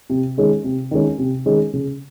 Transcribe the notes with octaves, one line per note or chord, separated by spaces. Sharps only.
C3
D#3 G#3 C#4
C3
D#3 G#3 C#4
C3
D#3 G#3 C#4
C#3